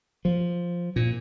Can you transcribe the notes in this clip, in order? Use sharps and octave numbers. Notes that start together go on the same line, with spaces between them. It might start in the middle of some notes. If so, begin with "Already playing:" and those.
F3
A#2